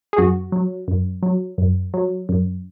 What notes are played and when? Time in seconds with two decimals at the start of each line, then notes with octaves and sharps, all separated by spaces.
0.13 G#4
0.18 F#2 F#4
0.52 F#3
0.88 F#2
1.23 F#3
1.58 F#2
1.94 F#3
2.29 F#2